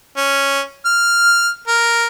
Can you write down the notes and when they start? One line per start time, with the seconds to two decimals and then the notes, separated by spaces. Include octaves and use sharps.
0.17 C#4
0.85 F6
1.68 A#4